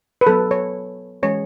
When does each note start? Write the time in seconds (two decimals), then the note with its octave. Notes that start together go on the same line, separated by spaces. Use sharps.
0.21 B4
0.27 F#3 B3 A4
0.51 C#5
1.23 E3 G#3 C#4 C#5